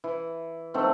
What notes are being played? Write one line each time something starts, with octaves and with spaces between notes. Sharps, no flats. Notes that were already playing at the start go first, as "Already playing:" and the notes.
E3
D#3 F#3 A3 C4